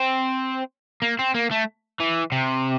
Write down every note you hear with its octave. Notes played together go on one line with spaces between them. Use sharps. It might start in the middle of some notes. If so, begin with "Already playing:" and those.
Already playing: C4
A#3
C4
A#3
A3
E3
C3